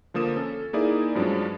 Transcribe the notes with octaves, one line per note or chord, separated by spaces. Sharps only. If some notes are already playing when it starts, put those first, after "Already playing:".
D3 F3 A#3 D#6 E7
C#4 A4
A#3 D#4 E4 G#4 D5
G2 F3 F#3 G#3 C#4 D4